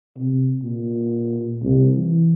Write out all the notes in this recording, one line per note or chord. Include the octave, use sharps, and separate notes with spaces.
C3
A#2
C2
E3